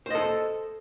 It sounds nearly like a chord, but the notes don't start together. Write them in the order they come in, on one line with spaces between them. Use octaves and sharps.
C5 D#5 A4